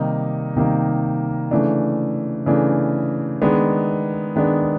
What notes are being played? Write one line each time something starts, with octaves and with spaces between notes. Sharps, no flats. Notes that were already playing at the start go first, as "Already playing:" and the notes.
Already playing: C3 D#3 G3 A#3 D#4
C3 D#3 G3 A#3 D#4
C#3 E3 A3 D4
C#3 E3 A3 D4
D#3 G#3 B3 D4
D#3 G#3 B3 D4